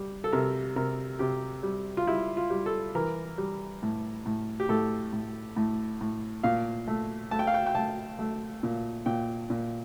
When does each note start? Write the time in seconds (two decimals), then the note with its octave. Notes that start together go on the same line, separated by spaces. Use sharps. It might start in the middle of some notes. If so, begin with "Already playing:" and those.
Already playing: G3
0.24 A4
0.33 C3 A#4
0.76 C3 A#4
1.19 C3 G4
1.63 G3
1.97 F4
2.07 G3 E4
2.37 F4
2.50 G3
2.66 A4
2.95 E3 A#4
3.38 G3
3.83 A2
4.26 A2
4.60 G4
4.69 A2 A4
5.13 A2
5.56 A2
6.01 A2
6.43 A#2 F5
6.88 A3
7.31 A3 A5
7.39 G5
7.47 F5
7.54 G5
7.66 G5
7.75 A3 A5
8.19 A3
8.63 A#2
9.06 A#2 G5
9.50 A#2